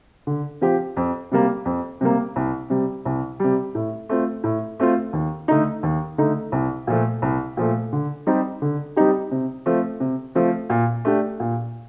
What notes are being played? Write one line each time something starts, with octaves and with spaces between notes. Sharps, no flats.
D3
F3 C4 G4
F2
C3 G3 A#3
F2
C3 G3 A#3
C2
C3 G3
C2
C3 G3
A2
A3 C4 F4
A2
A3 C4 F4
D#2
D3 A3 D#4
D#2
D3 A3 D#4
C2
A#2 F3 A3
C2
A#2 F3 A3
D3
G3 C4 D#4 G4
D3
G3 C4 D#4 G4
C3
F3 A3 C4
C3
F3 A3 C4
A#2
A3 D4 G4
A#2